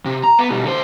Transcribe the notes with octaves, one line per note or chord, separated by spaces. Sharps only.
C3
A#5
B3
B2 G3
D3 C5